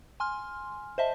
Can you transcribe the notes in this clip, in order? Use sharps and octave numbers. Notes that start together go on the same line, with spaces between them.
G#5 C6 F6
C5 D#5 E5 A5